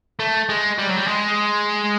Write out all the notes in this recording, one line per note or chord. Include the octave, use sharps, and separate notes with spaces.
A3
G#3
G3
F#3
G3
G#3